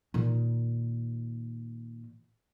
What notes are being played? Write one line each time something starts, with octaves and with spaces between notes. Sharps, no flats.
A#2 D#3